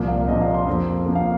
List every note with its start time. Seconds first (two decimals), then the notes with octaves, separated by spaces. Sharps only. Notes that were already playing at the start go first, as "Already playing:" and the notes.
Already playing: C2 A#2 F3 A#3
0.08 F5
0.28 C2 A#2 F3 A#3 D#5
0.41 F5
0.54 C6
0.67 F2 F3 A#3
1.06 F2 F3 A#3
1.15 F5